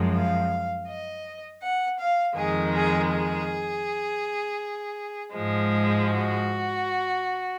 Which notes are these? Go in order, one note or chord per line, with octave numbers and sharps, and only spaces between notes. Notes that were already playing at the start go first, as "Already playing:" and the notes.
Already playing: F#2 F3 G#3
F5
D#5
F#5
F5
F2 D#3 G#3 G#4
G#4
G#4
G#2 F3 G#3
F#4